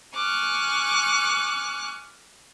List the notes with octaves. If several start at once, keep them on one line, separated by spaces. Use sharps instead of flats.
G#5 C#6 D6 F6 F#6